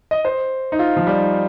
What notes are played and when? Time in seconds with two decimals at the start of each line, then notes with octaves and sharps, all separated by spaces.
0.11 D#5
0.25 C5
0.72 D#4
0.79 F4
0.96 F3
1.07 G3